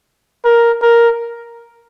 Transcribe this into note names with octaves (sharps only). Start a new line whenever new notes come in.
A#4
A#4